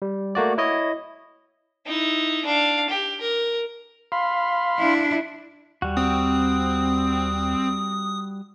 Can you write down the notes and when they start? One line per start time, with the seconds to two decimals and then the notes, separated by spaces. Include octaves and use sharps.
0.02 G3
0.35 A3 A#3 F#4 D5
0.58 E4 C#5 D#5
1.86 D#4 E4
2.45 D4 F5
2.90 G4
3.20 A#4
4.12 F5 B5 C6
4.78 D4 E4
5.82 D#2 G3 F#4
5.97 C4 D#6